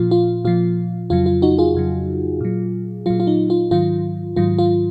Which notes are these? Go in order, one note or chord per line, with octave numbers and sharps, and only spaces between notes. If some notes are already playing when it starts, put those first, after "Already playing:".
Already playing: A#2 F3 F4
F4
A#2 F3 F4
F2 C#3 F#3 F4
F4
D#4 F#4
F4 G#4
F2 C#3 F#3
A#2 F#3
A#2 F#3 F4
F4
D#4
F4
G#2 D#3 F#3 F4
G#2 D#3 F#3 F4
F4